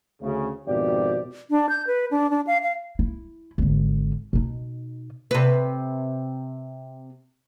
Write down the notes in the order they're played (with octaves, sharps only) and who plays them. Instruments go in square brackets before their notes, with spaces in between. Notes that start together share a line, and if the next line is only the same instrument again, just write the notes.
[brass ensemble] D2 C#3
G#1 F2 B2 G4 D5
[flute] D4
G6
B4
D4
D4
F5
F5
[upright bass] E4
G#1 D3
B2 D#4
[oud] C3 B4